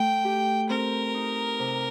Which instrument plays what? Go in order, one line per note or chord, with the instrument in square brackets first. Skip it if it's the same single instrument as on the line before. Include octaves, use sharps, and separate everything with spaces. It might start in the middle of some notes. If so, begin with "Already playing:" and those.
Already playing: [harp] A3 [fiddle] G5
[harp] G4
[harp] C4 [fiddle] A#4
[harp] D#4
C3